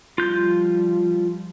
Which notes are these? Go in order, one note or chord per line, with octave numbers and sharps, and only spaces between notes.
F3 G3 F4 G6